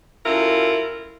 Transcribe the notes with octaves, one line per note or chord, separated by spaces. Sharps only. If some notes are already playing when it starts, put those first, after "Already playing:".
F#2 E4 F4 A4 A#4